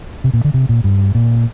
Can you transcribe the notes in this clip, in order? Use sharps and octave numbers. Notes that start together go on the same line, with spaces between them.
C3
A#2
D3
C3
A#2
G2
A#2